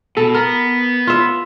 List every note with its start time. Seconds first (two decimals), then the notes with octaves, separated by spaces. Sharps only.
0.17 B2 A4
0.35 B3 A#4
1.07 F4 E5